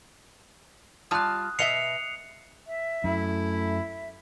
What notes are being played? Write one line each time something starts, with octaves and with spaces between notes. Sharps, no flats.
G3 F4 A5 D#6 F#6
B2 D#5 E5 C7 C#7 F7
E5
F#2 A3 E4
E5